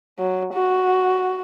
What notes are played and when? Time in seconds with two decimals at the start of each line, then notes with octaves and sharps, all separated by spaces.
0.19 F#3
0.54 F#4